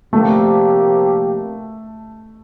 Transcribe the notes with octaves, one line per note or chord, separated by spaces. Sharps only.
C3 F3 A3 A#3 D4 G4